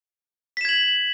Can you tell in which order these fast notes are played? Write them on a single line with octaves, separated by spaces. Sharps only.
B6 E7 G#6 F#7